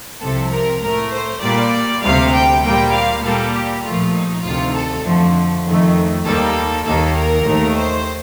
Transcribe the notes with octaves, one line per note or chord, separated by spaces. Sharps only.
C2 C3 F3 A4
A#4
A2 A3 A#4
C5
A#2 G3 A#3 D5
D2 C3 G3 F5
G5
A#2 G3 A#3 G5
F5
A#2 G3 A#3 A4
G4
A#2 F3 A3 F4
D#4
D2 C3 D#3 F4
A4
F2 D3 F3 A3
F2 D#3 A3
D#2 D#3 G3 A#3 A4
D#2 D#3 A#3 A4
A#4
D#2 D#3 A3
C5